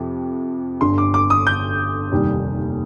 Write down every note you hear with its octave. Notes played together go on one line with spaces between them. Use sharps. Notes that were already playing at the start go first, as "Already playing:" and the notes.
Already playing: F2 C3 F3
G1 G2 D3 C6
D6
D6
D#6
G6
F1 D#2 D#3 G3